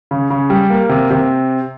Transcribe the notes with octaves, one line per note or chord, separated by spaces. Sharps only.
C#3
C#3
G3
A#3
C3
C3